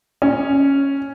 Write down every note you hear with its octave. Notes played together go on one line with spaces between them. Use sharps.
C#4